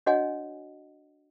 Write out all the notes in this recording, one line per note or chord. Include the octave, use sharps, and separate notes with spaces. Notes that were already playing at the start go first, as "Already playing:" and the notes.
D4 F#4 C#5 D#5 F#5 G#5